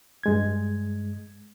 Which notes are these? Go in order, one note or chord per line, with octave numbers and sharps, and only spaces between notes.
G2 G#3 G#6